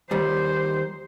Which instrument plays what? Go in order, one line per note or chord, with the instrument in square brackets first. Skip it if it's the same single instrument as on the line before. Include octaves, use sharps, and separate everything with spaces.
[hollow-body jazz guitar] D#2 G3 [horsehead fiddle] C5